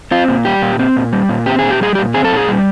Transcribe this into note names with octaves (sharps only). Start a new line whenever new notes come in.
C4 F4
A#2
G3 G4
A#2
C4
A#2
G3
A#2
C4 G4
A#2 G#4
G4
G3 G#4
A#2 G4
C4 G#4
A4
A#2 G#4
G3